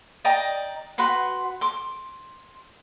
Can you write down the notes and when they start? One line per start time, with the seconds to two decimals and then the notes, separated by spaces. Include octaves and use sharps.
0.25 D5 D#5 G5 A#5
0.98 F#4 B4 B5 C6
1.61 C6 D6